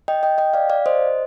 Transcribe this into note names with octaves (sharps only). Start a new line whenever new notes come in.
D#5 G5
D#5 G5
D#5 G5
D5 F5
D5 F5
C5 D#5